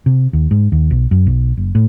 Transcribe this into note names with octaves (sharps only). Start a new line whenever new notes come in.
C3
D#2
G#2
D#2
B1
F#2
B1
F#1
A2